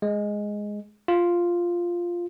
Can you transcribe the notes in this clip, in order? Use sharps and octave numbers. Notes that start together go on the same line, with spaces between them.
G#3
F4